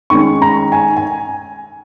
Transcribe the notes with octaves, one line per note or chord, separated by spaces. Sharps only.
D#3 G#3 C#4 C#6
A#5
G#5
G#5